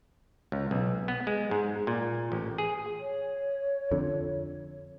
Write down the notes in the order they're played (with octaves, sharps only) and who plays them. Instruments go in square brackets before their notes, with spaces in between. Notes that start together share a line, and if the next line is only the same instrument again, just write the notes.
[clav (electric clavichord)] C#2
B1
B3
G#3
G#2
A#2
A1
G#4
[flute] C#5
[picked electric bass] F2 D3